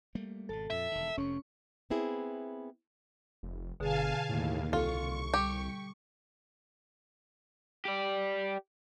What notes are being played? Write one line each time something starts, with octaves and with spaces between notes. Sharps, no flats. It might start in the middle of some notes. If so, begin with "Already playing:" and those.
G3 A3 A#3
G#1 B2 A4 A5
F2 A#2 E5
E1 D#3
F1 F2 C3 C#4 C#6
B3 C4 E4 G#4
F1
G1 B2 D3 G#4 F5 G#5 A5
D#2 A2
C2 F4 A4 C#6
G3 G4
G4 D5